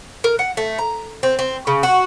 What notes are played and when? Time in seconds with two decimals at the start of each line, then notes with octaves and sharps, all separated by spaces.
0.24 A#4
0.39 F#5
0.57 A3
0.78 A#5
1.23 C4
1.39 C4
1.67 C#3
1.83 F#4